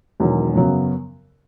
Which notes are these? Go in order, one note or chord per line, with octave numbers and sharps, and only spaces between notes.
E1 E2 D#3 F#3
F#2 C#3 F#3 B3